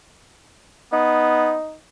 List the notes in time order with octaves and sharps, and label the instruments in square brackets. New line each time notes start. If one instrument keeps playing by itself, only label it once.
[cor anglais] B3 [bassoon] D#4